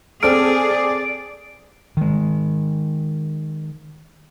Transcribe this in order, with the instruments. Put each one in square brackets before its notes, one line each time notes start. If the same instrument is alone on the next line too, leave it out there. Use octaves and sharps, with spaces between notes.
[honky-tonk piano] C4 A4 F6 [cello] G#4 [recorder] D5 [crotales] D7
[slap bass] D#3 G#3